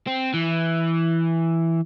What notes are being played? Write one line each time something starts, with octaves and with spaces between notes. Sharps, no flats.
C4
E3